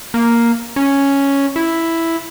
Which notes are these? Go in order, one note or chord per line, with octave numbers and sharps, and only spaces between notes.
A#3
C#4
E4